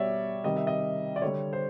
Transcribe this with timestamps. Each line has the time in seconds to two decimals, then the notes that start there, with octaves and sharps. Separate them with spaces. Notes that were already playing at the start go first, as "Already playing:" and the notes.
Already playing: B2 G3 C#5 D5 E5
0.44 C3 D#3 G3 D#5
0.56 E5
0.67 D#5
1.16 D5
1.22 D3 G3 C#5
1.53 C5